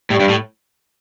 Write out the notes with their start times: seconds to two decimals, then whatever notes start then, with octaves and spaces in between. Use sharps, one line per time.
0.10 A2 G3
0.20 G2
0.29 A2